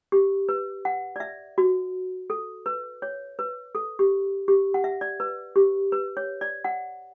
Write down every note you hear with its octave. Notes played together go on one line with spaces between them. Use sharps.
G4
B4
F#5
D5
E5
F#4
A4
B4
C#5
B4
A4
G4
G4
F#5
E5
D5
B4
G4
B4
C#5
D5
F#5